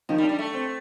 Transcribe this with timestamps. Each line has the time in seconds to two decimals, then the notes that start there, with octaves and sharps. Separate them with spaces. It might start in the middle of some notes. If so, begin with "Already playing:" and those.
0.09 D#3 F3 D#4
0.18 G3
0.23 D4
0.29 G3
0.39 A3
0.54 C4